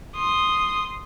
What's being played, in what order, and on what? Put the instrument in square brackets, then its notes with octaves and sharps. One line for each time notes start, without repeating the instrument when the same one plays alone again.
[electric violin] C6 D#6